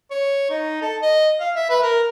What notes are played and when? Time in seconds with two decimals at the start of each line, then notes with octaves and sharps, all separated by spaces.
0.11 C#5
0.50 D#4
0.82 A4
1.02 D#5
1.40 F5
1.55 E5
1.70 B4
1.83 A#4